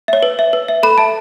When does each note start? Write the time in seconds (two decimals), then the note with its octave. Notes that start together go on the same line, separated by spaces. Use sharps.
0.08 C#5 E5
0.23 B4
0.39 E5
0.53 B4
0.68 E5
0.83 A4 B5
0.98 E5 A5